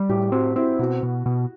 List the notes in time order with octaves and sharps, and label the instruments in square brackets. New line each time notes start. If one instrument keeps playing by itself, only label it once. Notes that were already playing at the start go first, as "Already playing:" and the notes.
Already playing: [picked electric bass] G3
[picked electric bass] A2 [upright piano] G4
[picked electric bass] C4 [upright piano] F#4
[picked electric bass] C4 [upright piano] E4
[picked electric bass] B2 [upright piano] F#4
[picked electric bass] B2
B2